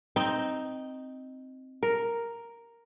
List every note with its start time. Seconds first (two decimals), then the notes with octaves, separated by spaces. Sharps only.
0.16 C4 D#4
1.83 A#4